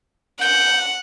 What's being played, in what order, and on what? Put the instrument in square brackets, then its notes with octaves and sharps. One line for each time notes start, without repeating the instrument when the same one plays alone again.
[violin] F#5 [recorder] G6